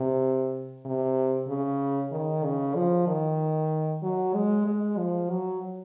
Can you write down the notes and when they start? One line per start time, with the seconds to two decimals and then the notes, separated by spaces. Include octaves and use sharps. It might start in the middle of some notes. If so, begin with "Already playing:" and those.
Already playing: C3
0.85 C3
1.48 C#3
2.12 D#3
2.44 C#3
2.75 F3
3.08 D#3
4.03 F#3
4.34 G#3
4.66 G#3
4.98 F3
5.30 F#3